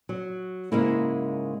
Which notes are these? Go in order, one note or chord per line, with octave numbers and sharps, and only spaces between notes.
F#3
G#2 C#3 G#3 A#3 C#4 E4